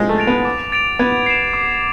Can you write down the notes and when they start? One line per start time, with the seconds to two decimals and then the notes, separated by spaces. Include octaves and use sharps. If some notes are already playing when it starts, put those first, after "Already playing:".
Already playing: F3 G#3
0.09 A3
0.18 A6 D7 F7
0.27 B3
0.45 D6
0.72 A6 D7 F7
0.99 B3 G#6
1.26 C7 E7
1.54 D6